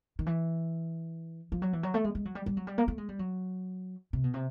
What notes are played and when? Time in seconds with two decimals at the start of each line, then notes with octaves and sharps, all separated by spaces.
0.19 D#3
0.26 E3
1.52 F3
1.62 F#3
1.73 E3
1.83 F#3
1.94 A3
2.04 G#3
2.15 G#3
2.25 F#3
2.35 G3
2.46 G3
2.57 F#3
2.67 G3
2.78 A#3
2.88 A3
2.98 G#3
3.09 G3
3.19 F#3
4.13 C3
4.24 B2
4.34 C3